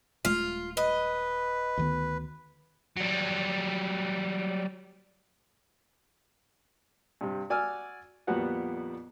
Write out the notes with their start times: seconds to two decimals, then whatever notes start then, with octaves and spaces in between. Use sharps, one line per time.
0.25 D#1 G#3 A3 F4
0.77 B4 D#5
1.77 D2 D#3 B3
2.97 F#3 G3
7.21 G2 C3
7.50 F#4 D5 G#5 E6 F6
8.27 F2 A#2 G3 B3 F#4 F#5